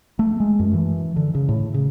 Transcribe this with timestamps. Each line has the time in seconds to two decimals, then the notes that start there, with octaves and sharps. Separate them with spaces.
0.19 A3
0.40 G#3
0.59 F#2
0.74 E3
1.16 D3
1.35 C#3
1.49 A2
1.74 C#3